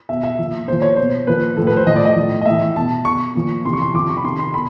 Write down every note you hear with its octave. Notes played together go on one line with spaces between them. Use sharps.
B2 E5
E5
A#2 F3
A#2 F3 C5
C#5
B2 C5
A#2 F3 B4
A2 F3 A4
B4
C5
A2 F3 D#5
D5
D#5
A2 F3
D#5
A2 E3 E5
B2 A5
B2 C#6
A#2 F3
C3 E3 C6
C#6
C6
C3 F3 D6
C#6
B5
C3 D#3 C6
C6
B2 B5